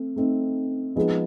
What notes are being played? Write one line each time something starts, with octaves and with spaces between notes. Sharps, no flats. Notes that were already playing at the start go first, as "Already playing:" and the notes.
Already playing: A3 C4
A3 C4 D#4
F3 G#3 B3 D#4 G#4